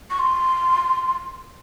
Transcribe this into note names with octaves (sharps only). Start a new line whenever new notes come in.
C#6
C6